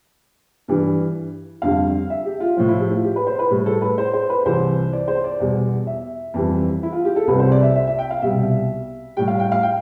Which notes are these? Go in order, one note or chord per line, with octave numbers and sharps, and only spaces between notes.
G2 E3 G3
F2 D3 G3 F5
E5
G4
F4
A2 F3 F4
E4
G4
F4
G4
B4
C5
B4
A2 G3 G4
A4
B4
C5
C5
B4
C2 C3 E3 C5
D5
C5
D5
E2 B2 G3
E5
F2 E3 G3
E4
F4
G4
A4
C2 C3 G3 B4
C5
D5
E5
E5
E5
G5
F5
C2 B2 G3 E5
A2 G3 G5
F5
G5
F5
G5